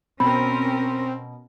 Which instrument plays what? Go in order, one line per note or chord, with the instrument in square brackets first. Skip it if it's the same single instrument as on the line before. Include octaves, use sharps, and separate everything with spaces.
[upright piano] B2 [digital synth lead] C4 [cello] C#4 A#4 [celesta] B5